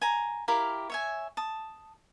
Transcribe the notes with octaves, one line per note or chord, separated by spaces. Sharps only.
G#5 A#5
E4 G4 A#4 F5
C#5 E5 G#5
A5 D#6